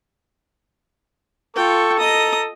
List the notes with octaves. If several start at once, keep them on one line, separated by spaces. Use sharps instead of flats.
F4 A4 G5 C#6
D#5 A#5 D#6